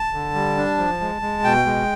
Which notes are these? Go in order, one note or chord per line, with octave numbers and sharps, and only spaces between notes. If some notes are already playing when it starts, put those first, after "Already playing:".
Already playing: A5
D3
G3
D4
F3
G#3
G#3
B2 G5
G#3